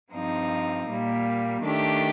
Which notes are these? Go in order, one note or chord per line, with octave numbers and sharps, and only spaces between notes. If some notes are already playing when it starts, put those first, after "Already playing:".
G2 F3 C4 D#4
A#2 G3 A#3
D#3 A3 D4 G4